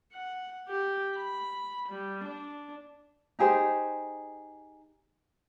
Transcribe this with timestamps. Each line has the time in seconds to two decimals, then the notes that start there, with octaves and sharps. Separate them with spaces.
0.12 F#5
0.68 G4
1.16 B5
1.89 G3
2.24 D4
3.39 D#4 G4 G#4 C5